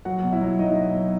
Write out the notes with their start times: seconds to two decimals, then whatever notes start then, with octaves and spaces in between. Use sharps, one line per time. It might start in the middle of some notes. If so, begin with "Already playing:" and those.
0.05 F#3 F#4 F#5
0.23 B2
0.33 E4 E5
0.41 F#3
0.59 F#3 D#4 D#5
0.77 B2
0.95 F#3